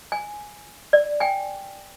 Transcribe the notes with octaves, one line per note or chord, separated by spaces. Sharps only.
G#5
D5
G5 G#5